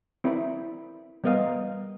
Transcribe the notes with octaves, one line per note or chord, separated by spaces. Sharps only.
C4 E4 A#4 D5 B5
G3 B3 A#4 D#5 F5 G5